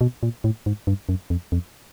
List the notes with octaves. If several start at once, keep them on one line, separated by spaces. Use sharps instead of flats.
B2
A#2
A2
G#2
G2
F#2
F2
F2